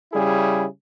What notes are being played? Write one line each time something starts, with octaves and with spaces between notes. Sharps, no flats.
C#3 G3 E4 G#4